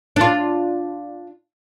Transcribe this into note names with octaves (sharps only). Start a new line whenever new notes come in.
D4 F4